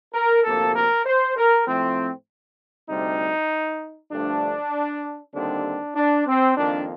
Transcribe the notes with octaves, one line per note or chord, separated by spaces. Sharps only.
A#4
D2 C3 F3 A#3 A4
A#4
C5
A#4
A2 F3 A3 C4
D2 C3 G3 C4 D#4
G2 D3 F3 A3 D4
D#2 D3 G3 C4 D4
D4
C4
F2 D#3 A#3 D4